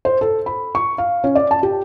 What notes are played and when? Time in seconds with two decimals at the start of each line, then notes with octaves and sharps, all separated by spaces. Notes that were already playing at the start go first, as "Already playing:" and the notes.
0.05 C5
0.21 A4
0.46 B5
0.75 C#6
0.98 F5
1.24 C#4
1.35 D5
1.51 A5
1.63 G4